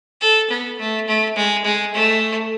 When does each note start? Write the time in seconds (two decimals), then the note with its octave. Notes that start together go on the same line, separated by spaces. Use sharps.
0.21 A4
0.50 B3
0.79 A3
1.07 A3
1.36 G#3
1.64 G#3
1.93 A3